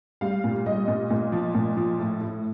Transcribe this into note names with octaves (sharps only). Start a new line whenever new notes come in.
G3 F5
A#2
G3 D#5
A#2
A#2
F3
A#2
F3
A2
A2